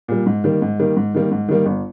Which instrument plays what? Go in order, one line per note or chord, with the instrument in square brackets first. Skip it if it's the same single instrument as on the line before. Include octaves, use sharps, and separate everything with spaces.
[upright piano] A#2 G3
G#2
D#3 G3 A#3
G#2
D#3 G3 A#3
G#2
D#3 G3 A#3
G#2
D#3 G3 A#3
G1